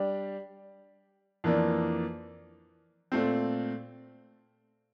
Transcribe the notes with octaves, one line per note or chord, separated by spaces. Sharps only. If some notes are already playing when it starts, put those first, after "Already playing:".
Already playing: G3 D4 G4
F2 E3 A#3 D4
A#2 A3 C4